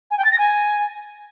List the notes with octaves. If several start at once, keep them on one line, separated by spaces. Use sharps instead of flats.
G#5
G5
A6
A#6
G#5